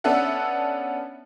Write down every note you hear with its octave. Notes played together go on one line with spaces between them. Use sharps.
B3 C#4 D4 A4 E5 F#5